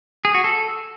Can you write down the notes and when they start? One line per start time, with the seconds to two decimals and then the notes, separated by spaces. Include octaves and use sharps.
0.25 G#4
0.34 F#4
0.44 A4